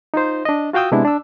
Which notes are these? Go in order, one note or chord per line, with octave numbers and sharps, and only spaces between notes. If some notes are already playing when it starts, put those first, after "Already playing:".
D#4 F4 C5
D4 D#5
F4 F#4 F5 G5 D#6 E6
C3 G#3 B3 D4 E4
D4 E6